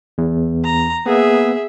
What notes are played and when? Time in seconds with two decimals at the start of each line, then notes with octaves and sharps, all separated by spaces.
0.18 E2
0.65 A#5
1.06 A#3 B3 G#4 E5